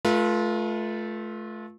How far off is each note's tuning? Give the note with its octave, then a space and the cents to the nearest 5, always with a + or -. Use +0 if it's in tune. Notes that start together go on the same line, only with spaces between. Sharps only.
A3 -25 F4 +0 B4 -45